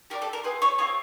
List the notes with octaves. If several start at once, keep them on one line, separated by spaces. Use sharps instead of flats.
D4 G4 A#4
A4
A#4
C4 F4 G#4 B4
C#5
C4 F4 G#4 C#5